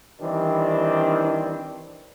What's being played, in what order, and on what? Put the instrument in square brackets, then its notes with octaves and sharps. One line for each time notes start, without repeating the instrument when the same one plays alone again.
[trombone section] D#3 E3 G3 C4 D4